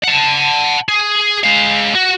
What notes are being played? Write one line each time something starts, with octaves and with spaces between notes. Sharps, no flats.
F#5 A5
G#4
G#3 F5
F#4